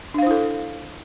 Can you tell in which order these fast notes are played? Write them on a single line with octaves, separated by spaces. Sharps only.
D4 F5 C5 E4 A4